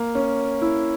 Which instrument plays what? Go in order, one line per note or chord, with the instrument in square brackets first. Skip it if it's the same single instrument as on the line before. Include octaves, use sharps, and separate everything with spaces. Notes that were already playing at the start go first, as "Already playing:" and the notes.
Already playing: [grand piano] A#3
C#4
E4